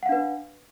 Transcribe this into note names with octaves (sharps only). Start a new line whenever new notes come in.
D4 B4 F5 F#5